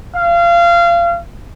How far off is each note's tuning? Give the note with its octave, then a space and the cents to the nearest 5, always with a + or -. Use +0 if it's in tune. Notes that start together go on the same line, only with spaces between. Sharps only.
F5 -25